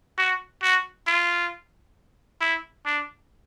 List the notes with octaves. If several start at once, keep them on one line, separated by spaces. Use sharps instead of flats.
F#4
F#4
F4
E4
D4